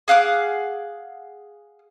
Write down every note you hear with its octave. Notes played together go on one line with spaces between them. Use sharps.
G#4 F5 F#5 D6